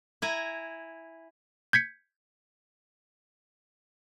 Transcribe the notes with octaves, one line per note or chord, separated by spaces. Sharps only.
E4 G#5 A#5
G6 G#6 B6 C#7